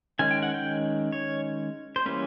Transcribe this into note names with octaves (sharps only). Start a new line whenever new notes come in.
D#3 G#3 C#4 G#5
G5
F#5
G5
C#5
C5
E3 G3 A#3 C#4 B4